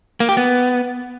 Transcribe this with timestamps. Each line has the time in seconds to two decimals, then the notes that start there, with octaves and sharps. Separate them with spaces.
0.20 A#3
0.29 G4
0.37 B3